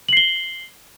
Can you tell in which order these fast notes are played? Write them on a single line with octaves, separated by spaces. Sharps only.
F#7 C7 G7